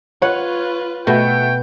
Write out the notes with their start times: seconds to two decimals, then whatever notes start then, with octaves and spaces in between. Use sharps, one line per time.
0.22 F4 B4 C#5 F#5
1.07 B2 A3 F#4 G5